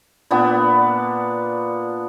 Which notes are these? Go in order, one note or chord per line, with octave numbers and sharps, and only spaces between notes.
A#2 B3 D4